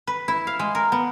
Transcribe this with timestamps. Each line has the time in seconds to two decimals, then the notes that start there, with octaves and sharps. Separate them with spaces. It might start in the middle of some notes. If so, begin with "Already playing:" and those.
0.07 B4
0.28 E4
0.47 F5
0.59 G#3
0.75 A#4
0.92 B3